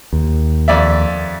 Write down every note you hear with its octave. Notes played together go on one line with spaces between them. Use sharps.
D#2
F2 D5 E5